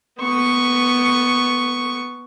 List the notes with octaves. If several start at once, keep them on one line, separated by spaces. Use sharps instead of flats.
B3 C#6